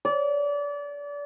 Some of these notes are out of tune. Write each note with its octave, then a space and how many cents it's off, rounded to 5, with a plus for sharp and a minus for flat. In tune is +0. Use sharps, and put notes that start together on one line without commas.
D5 -30